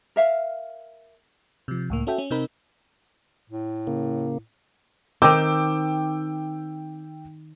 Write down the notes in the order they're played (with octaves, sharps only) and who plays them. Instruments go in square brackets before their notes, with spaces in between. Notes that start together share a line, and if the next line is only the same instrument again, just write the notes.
[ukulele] A#4 E5 F5
[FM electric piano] C3 F3
C#2 A2 A#3
C#4 F#4 A4 E5 G5
C#4
C3 C4 D#4 A#4 B5
[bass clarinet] A2
[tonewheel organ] C#3 A#3
[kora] D#3 C4 [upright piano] G5 D6 E6